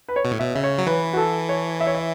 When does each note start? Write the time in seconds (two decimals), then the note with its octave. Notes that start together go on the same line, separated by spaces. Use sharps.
0.08 B4
0.16 C#5
0.25 B2
0.31 A2
0.39 B2 E5
0.55 C#3 E5
0.63 C#5
0.78 F#3
0.87 E3 B4
1.13 F#4
1.17 A4
1.49 C#5
1.80 E5
1.87 C#5
1.95 E5